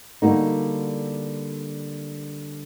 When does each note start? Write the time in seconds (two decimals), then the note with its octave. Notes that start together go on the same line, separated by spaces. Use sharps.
0.22 D3 G3 A#3 D#4 F#4